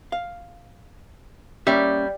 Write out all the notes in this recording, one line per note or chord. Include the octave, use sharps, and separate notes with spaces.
F5
G3 A#3 C#4 E5